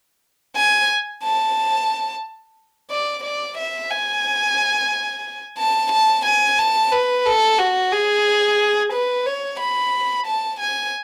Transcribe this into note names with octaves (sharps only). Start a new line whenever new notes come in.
G#5
A5
D5
D5
E5
G#5
A5
A5
G#5
A5
B4
A4
F#4
G#4
B4
C#5
B5
A5
G#5